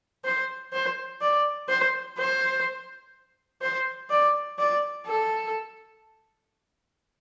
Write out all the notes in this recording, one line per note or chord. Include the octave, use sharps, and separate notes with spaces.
C5
C5
D5
C5
C5
C5
D5
D5
A4